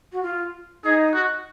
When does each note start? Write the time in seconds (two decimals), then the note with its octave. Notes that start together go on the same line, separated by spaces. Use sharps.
0.12 F#4
0.23 F4
0.84 D#4 G#4
1.14 F#4